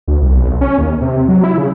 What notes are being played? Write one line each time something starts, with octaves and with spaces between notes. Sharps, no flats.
D2
C2
B1
C#4
D#2
C3
F#3
E4
C#3